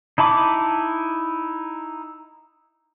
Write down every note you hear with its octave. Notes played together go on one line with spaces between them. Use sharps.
D#4 E4 A5 B5 D6